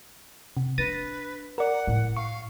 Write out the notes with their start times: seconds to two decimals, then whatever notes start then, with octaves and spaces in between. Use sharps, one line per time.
0.57 C3
0.78 D4 B4 A6 A#6 D#7
1.58 A#4 D5 F#5
1.87 A2
2.17 F5 C#6